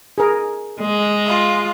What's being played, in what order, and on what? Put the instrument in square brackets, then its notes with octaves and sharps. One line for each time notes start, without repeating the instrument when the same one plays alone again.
[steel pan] G#4 A#4
[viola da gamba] G#3
[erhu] F4